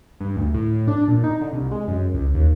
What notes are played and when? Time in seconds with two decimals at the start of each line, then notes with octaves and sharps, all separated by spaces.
0.20 G2
0.36 D2
0.54 A2
0.88 D4
1.08 A#2
1.24 D#4
1.41 D3
1.53 C2
1.71 G#3
1.88 F#2
2.14 C#2
2.35 D#2